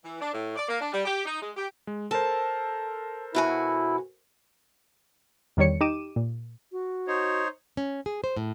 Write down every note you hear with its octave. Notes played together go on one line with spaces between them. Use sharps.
E3
D4
A2
D5
A#3
D4
G3
G4
D#4
G#3
G4
G#3
A4 A#4 C5 A5
B2 E4 F#4 G#5
E2 D#3 G3 C#5 C#7
D#4 G4 D6 D#7 E7
A#2
F#4
D#4 C5 C#5
C#4
G#4
C5
A2